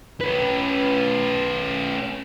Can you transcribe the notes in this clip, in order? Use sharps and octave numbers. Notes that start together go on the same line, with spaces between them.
C#4 B4